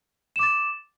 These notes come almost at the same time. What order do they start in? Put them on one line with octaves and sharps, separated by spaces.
E7 D6 A6